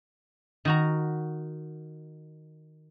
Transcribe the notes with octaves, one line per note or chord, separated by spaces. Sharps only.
D#3 F#4 A#5